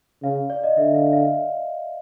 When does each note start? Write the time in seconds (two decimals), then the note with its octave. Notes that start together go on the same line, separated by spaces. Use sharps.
0.23 C#3 F5
0.50 D5
0.64 D#5
0.77 D3 E5
0.94 F5
1.13 F5